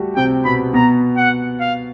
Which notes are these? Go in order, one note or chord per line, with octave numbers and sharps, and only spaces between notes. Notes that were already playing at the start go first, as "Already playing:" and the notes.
Already playing: G3 A3 F#4 G4
C3 C4 G5
B2 B3 B5
B2 B3 A#5
F#5
F5